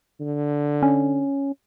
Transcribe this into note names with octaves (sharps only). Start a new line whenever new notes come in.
D3
C#4